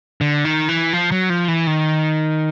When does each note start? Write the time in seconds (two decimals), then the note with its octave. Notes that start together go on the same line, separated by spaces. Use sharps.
0.21 D3
0.45 D#3
0.69 E3
0.93 F3
1.11 F#3
1.30 F3
1.48 E3
1.67 D#3